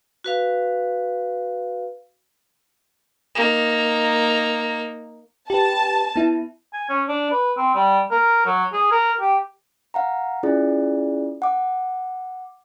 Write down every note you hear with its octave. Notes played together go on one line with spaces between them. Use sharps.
F#4 B4 F5
A#3 D#4
G4 B4 A5
B3 E4
G#5
C#4
D4
B4
C4
G3
A#4
F#3
G#4
A#4
G4
F5 F#5 A#5
C#4 E4 F4 G#4 D5
F#5 D6